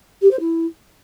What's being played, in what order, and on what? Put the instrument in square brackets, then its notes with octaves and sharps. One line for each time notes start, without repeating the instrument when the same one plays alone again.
[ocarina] G4
C5
E4